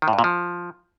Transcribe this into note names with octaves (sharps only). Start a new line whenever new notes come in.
D#3
A2
G2
A#2
F3